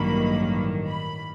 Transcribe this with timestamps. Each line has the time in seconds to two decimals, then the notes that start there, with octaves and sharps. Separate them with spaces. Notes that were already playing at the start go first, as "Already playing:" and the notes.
Already playing: A1 G2 D#3 F#3 A#3 B5
0.87 B5